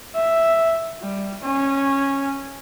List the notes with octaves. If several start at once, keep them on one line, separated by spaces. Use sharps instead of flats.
E5
G3
C#4